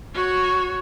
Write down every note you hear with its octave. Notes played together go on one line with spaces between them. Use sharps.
F#4 C#5